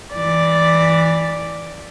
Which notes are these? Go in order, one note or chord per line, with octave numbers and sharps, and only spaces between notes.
E3 D5